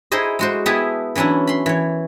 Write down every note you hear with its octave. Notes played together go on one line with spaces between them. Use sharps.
D#4 E4 G#4 C5 D#5
G#3 F#4 C5
B3 E4 G4 G#4 E5 A5
E3 F#3 C#4 D4 E4
B5 C6
E3 C#5